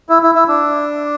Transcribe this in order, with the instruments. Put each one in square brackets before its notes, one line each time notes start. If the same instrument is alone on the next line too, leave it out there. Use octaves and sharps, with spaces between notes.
[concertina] E4
E4
E4
D4